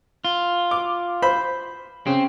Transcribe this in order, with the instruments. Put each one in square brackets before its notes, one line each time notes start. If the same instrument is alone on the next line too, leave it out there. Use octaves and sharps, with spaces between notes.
[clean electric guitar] F4
[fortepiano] D6
C5 B5
[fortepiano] C#3 [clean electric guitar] C4